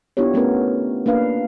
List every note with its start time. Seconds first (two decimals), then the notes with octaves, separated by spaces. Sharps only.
0.17 B3 D4 E4 F4 G4 C#5
0.34 A3 B3 C#4 A#4 B4
1.06 A#3 D4 B4 F5